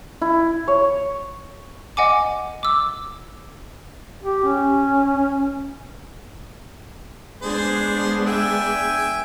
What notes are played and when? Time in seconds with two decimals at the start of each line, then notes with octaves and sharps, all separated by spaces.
0.22 E4
0.68 C#5
1.97 D#5 F#5 G#5 D6
2.63 D6 E6
4.23 G4
4.44 C#4
7.42 G#3 B3 D4 G#4 C5
8.26 E5 G5 G#5